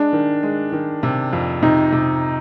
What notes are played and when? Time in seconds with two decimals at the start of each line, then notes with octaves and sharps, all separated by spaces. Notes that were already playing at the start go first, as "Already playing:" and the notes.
Already playing: G#3 D4
0.13 D#3
0.43 G#3
0.72 D#3
1.03 C3
1.33 F2
1.62 C3 D#4
1.92 C3